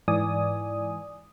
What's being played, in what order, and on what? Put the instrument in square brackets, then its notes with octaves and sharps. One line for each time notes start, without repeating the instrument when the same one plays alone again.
[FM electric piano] G#2 E3 D5 G#5 D#6